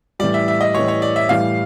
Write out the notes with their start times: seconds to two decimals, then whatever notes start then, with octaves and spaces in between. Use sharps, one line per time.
0.19 A2 E3 G3 D5
0.34 E5
0.48 E5
0.61 D#5
0.75 A2 E3 G3 C#5
0.88 C#5
1.02 D5
1.16 E5
1.29 A2 E3 G3 F5